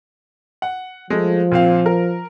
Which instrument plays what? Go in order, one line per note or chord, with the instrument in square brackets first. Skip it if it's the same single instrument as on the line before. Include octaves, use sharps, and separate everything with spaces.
[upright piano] F#5
[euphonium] F3 [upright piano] G#3 A3
[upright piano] A#2 C4 F5
A#4